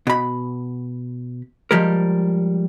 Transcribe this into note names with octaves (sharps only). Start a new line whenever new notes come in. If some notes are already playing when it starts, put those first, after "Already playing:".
B2 B5
F3 G3 G#3 A#4